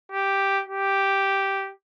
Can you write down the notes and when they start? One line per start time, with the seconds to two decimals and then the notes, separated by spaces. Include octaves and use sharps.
0.12 G4
0.69 G4